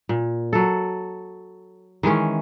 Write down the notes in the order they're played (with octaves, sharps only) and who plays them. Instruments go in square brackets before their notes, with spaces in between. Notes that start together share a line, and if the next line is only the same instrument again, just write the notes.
[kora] A#2
F#3 A4
D#3 E3 G#3 C#4